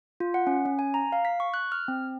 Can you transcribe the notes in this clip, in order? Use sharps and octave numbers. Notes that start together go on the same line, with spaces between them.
F4
F#5
C#4
C#4
G#5
A#5
F5
B6
C#6
F#6
F6
C4